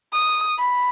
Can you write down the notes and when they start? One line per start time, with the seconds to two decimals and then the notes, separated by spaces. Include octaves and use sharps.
0.13 D#6
0.59 B5